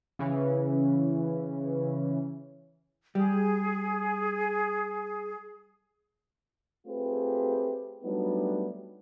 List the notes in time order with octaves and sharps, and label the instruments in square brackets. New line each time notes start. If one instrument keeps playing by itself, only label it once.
[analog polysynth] C#3 E3 C#4
[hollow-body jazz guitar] G3 [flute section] G#4
[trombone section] A3 C4 F4 G4 G#4 B4
F#3 G3 A3 B3 D4 D#4